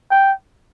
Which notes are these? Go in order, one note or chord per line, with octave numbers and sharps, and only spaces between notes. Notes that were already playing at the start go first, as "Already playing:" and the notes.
G5